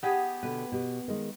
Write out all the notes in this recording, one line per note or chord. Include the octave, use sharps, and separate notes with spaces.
B3 G4 G#4
B2 D3 B4
B2 G4
D#3 G#3